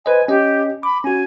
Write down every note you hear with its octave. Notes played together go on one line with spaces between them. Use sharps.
B4 C5 D#5 G#5
C#4 G4 D#5
B5 D6
C#4 F#4 G#5